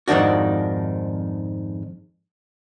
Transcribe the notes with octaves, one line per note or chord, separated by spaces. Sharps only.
F2 G#2 D#3 D4 F#4